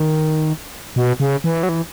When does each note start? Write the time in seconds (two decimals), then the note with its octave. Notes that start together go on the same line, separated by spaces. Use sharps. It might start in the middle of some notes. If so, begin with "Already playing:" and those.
Already playing: D#3
0.96 B2
1.20 C#3
1.44 E3
1.63 F#3
1.69 E3